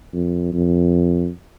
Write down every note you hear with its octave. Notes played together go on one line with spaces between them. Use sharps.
F2
F2